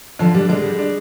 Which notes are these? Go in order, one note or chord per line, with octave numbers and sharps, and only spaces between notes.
D3 F3
G3 D4
D3 G#3
G3
D4